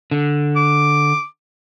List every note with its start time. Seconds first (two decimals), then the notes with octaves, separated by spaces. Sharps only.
0.11 D3
0.56 D6